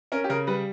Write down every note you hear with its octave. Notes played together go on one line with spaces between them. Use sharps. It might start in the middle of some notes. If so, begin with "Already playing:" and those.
C#4 A#4
G4
C#3 A#4
G3 B4